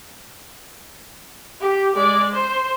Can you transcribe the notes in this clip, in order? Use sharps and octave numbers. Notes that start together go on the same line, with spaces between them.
G4
G#3 D5
C5